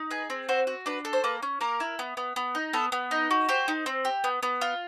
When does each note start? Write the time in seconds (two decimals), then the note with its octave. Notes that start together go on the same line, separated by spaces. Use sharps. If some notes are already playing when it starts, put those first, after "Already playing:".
Already playing: D#4
0.11 G#4 B4
0.30 C4
0.49 F#4 C5
0.67 F#4
0.86 D4 B4
1.05 A4
1.13 C5
1.24 A#3 B4
1.42 C#4
1.61 A#3 A#4
1.80 E4
1.99 B3
2.17 B3
2.36 B3
2.55 D#4
2.73 B3 A4
2.92 B3
3.11 D#4
3.31 F#4
3.49 G4 C5
3.68 D#4
3.86 C4
4.05 G4
4.24 B3
4.43 B3
4.61 F4